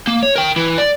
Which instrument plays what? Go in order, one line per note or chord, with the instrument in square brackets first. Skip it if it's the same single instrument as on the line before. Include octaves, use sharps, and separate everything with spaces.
[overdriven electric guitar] A#3
C#5
A#4 G5
E3 E4
D5